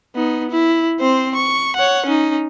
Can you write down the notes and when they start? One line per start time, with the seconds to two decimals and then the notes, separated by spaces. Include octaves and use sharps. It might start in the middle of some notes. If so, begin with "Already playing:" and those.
0.16 B3 D#4
0.51 E4
1.00 C4 C5
1.35 C#6
1.76 C#5 F#5
2.06 C#4 D#4